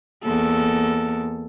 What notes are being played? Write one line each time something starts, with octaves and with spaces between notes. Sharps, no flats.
E2 A#3 A4